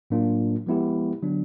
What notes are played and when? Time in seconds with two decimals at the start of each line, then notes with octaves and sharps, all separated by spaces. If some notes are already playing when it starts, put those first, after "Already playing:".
0.10 A2 F#3 A#3 D4 F4
0.66 F3 G#3 B3 E4 G4
1.22 D3 F#3 B3 D4